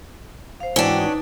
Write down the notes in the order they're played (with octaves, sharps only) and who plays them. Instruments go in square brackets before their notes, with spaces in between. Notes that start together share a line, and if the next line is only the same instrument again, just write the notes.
[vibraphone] C5 F5
[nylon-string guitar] G#2 E3 F#4 [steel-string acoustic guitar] C#4 D4 [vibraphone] E4 G5 D6
[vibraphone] D#4 B4